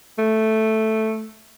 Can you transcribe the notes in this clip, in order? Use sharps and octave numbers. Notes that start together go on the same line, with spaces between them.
A3